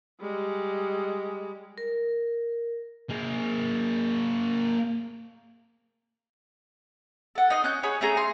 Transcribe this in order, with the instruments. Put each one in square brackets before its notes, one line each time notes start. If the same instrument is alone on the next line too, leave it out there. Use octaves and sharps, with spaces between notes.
[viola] G3 G#3
[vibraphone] A#4
[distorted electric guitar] A#3 G#4
[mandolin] A4 F#5
D#4 D#5 C6
C#4 F#6 G6
G#4 C#5 B5
A3 C#4 G#4 A#5
G#4 C6